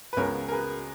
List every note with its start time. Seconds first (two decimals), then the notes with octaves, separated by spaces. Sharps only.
0.13 B4
0.17 C#2 C#3 G#3 B3 A#4 C#5
0.48 A#4
0.52 G#4 B4